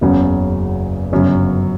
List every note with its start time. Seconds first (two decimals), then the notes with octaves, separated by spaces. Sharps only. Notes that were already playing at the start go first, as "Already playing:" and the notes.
0.01 F#1 E2 C#3 F#3
1.12 G1 F#2 C#3 F#3